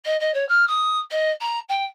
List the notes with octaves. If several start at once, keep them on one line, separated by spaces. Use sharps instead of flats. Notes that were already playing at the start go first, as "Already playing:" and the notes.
D#5
D#5
C#5
F6
D#6
D#5
A#5
G5